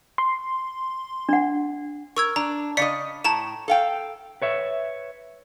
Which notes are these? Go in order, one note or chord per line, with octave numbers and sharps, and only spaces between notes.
C6
D4 F#5
A#4 C#6 E6 G#6
D4 A#5
C#3 D4 D5 D#5 B6 C#7
A2 A5 A#5 E7
A4 F5 G5
B4 C#5 E5